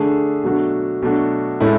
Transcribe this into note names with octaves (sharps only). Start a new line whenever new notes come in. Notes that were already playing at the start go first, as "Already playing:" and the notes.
Already playing: D3 A3 D4 G#4
B2 F#3 A3 D4 F#4
B2 F#3 A3 D4 F#4
A2 G#3 C#4 E4 A4